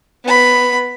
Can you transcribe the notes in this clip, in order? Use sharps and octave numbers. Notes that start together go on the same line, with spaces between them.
B3 B5